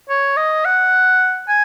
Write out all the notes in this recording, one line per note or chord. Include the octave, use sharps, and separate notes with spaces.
C#5
D#5
F#5
G#5